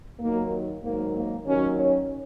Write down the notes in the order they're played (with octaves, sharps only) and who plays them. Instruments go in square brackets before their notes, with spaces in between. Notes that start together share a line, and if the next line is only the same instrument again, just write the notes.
[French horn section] D#2 D#3 F#3 A#3
G#2 D#3 F#3 A#3
A#3
D#2 D#3 F#3 C#4
C#4